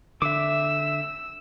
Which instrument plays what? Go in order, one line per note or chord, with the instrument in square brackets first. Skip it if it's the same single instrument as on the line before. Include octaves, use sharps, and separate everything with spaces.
[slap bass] D3 [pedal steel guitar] E5 D6 [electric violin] E6